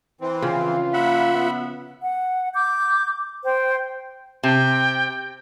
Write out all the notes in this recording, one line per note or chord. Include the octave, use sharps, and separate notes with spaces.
E3 C4
C#3 F3 F4
A#3 E5 F#5 B5
B3
F#5
D6 G6
C5 G5
C3 G5